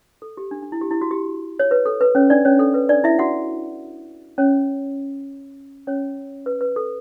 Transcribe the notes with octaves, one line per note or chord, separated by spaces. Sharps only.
A4
G4
D4
D4
E4
G4
E4
F#4
G4
C#5
B4
A4
B4
C#4 C#5
D4 D5
C#4 C#5
A4
B4
D4 D5
E4 E5
F#4 F#5
C#4 C#5
C#4 C#5
B4
B4
A4